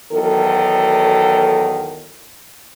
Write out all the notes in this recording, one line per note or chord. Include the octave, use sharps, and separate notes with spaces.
E2 D#3 F#3 A4